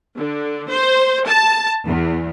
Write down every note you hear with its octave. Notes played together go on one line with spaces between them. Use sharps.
D3
C5
A5
E2